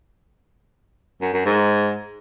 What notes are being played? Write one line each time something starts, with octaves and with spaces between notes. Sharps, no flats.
F#2
F#2
G#2